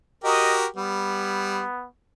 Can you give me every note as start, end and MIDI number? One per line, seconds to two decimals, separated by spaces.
0.24 0.66 66
0.24 0.66 67
0.24 0.66 70
0.24 0.57 75
0.76 1.61 55
0.76 1.86 59